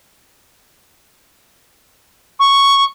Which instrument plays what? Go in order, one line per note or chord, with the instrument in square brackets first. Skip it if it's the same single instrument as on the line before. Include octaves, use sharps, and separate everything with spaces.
[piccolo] C#6